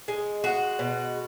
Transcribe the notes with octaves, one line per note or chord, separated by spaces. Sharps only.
G#3
G#3 F#4
B2